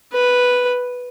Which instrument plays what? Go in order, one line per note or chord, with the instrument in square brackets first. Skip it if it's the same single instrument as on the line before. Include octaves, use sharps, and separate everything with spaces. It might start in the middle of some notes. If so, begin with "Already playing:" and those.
[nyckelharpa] B4